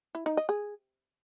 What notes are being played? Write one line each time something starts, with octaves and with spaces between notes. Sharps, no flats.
E4
D#4
D#5
G#4